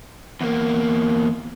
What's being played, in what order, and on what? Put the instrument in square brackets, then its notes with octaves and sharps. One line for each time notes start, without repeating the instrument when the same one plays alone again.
[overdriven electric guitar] E2 A#3